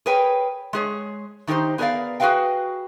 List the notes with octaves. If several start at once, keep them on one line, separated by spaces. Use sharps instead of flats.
G#4 A#4 B4 C#5 G5
G#3 G#4 C#5
D#3 D#4 G4 A#4 C5
B3 G#4 A#4 C#5 D5 F5
F#4 G#4 A#4 B4 F5 G5